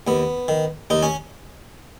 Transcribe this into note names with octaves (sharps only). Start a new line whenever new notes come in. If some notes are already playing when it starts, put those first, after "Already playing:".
D#2 B3
D#3
D#2 D#4
C#4